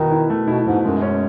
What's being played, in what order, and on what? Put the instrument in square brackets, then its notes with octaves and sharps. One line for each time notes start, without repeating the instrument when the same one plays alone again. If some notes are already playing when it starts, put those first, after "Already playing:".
Already playing: [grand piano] B2 E4 B4 [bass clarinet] D#3
[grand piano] E4
A3
[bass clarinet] B2 [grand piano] E4
[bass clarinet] G#2 [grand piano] B2
[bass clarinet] F#2 [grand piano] G#3
[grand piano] C#4